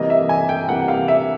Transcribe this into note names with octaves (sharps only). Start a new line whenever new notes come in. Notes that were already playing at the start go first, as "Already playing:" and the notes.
Already playing: C3 E3 G3 A#3 D#5
E5
G#5
G5
C3 E3 G3 A#3 F#5
F5
E5